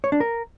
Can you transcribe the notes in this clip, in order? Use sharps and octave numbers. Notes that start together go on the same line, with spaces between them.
C#5
D4
A#4